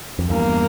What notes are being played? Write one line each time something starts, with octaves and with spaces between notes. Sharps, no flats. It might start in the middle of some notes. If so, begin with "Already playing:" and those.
F2
E2 G2 A#3